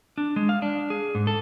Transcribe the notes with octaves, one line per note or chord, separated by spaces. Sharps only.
D4
G#3
F5
D4
G#4
G#2
A4